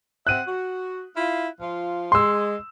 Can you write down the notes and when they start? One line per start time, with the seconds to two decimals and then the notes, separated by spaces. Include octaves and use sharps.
0.27 C4 E5 F#5 F#6 D#7
0.48 F#4
1.16 E4 F4
1.60 F3 F4
2.12 G#3 C6 E6